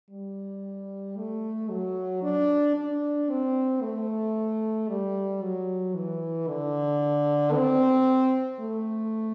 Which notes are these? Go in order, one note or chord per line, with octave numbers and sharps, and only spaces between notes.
G3
A3
F#3
D4
D4
C4
A3
G3
F#3
E3
D3
C4
A3